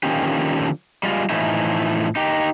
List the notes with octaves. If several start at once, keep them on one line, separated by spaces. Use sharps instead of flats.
D3 D#3 F3 A#3 C#4 G4
G3 G#3 F4
A2 E3 F3 A3 D#4 E4
D#4 G4